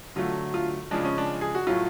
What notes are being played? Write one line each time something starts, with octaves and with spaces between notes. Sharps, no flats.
D3 F#3 A3 F4
F4
C#3 F3 G#3 D4
C#4
D4
G#4
F#4
A2 F#3 A3 F4